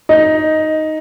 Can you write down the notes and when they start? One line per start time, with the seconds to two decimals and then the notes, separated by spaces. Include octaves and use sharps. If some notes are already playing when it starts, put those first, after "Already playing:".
0.09 D#4